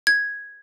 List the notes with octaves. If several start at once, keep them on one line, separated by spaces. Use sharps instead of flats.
G#6